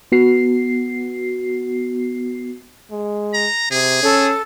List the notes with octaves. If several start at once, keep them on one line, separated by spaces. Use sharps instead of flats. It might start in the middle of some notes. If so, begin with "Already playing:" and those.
B3 F#4 C7
G#3
A#5
C3 G#4
C#4 A4